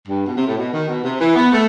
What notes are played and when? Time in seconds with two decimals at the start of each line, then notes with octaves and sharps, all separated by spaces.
0.08 G2
0.25 B2
0.36 C3
0.46 A2
0.56 B2
0.72 D#3
0.87 B2
1.03 C3
1.19 E3
1.35 B3
1.51 A3